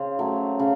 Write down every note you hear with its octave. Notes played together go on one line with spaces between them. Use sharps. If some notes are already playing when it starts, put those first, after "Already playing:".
Already playing: C#3 C5
F#3 A3
C#3